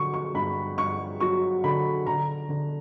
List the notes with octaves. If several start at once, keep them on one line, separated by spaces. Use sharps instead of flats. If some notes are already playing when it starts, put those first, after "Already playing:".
Already playing: D3 F#3 C#6
C#6
G2 B5
G2 C#6
F#3 C#6
D3 B5
D3 A#5
D3